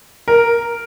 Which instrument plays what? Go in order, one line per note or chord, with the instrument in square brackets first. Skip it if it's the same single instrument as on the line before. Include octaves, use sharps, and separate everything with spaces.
[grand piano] A#4